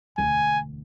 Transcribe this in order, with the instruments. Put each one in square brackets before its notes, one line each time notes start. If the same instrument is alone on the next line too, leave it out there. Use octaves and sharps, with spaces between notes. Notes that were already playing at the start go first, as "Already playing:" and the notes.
[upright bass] E1 D2 [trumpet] G#5